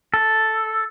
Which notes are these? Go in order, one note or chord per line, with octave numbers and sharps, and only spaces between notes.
A4